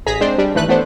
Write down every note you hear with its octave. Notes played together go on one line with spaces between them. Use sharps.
A1 G#4 A#5 B6
G#3 C4 D4 C5
G3 D4
G2 D#3 E3 A3 B4 F#6
E3 A3 B3 D4 C5